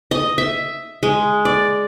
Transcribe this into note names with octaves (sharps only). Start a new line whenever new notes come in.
D#5
E5
G#3
D5